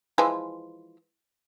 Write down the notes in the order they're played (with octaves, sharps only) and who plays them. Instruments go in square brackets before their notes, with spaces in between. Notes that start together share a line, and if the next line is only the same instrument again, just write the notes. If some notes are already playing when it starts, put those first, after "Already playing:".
[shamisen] E3 F3 G#3